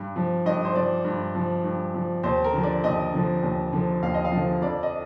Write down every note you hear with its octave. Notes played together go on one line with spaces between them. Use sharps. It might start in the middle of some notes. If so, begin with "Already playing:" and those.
Already playing: G2
F3
G2 D#5
C5
F3 D5
G2
F3
G2
F3
D#2 C5
A#4
D3 F3
D5
D#2 D#5
D3 F3
D#2
D3 F3
D#2 F5
D#5
F5
D3 F3
F2 D5
D#5